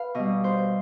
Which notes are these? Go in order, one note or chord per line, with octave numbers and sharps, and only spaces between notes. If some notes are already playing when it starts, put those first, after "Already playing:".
Already playing: B4 F5
B2 G3 D#5
C5